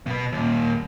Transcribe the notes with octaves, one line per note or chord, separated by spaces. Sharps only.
B2 B4
D#2 A#2